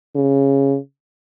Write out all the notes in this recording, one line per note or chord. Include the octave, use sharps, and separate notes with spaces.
C#3